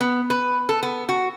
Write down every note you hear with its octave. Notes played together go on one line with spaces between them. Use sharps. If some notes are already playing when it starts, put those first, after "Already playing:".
B3
B4
A4
B3
F#4